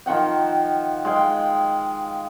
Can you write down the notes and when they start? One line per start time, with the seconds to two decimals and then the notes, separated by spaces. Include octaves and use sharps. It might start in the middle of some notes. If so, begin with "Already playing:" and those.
0.06 D#3 F3 F#5 G5
1.05 G#3 F5 G5